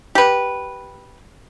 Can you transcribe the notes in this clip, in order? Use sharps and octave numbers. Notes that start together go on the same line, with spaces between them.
G4 B4